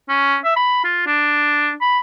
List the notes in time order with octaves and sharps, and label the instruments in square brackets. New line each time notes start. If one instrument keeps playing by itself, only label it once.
[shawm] C#4
E5
B5
F4
D4
B5